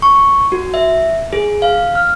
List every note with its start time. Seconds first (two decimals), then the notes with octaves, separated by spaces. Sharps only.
0.02 C#6
0.52 F#4
0.74 E5
1.33 G#4
1.62 F5
1.95 F6